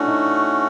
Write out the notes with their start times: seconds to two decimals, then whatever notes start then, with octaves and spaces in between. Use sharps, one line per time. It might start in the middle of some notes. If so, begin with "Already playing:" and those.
Already playing: A3 C#4 D4 E4 F#4
0.08 D#4